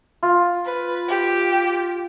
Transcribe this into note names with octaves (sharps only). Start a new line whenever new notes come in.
F4
B4
G4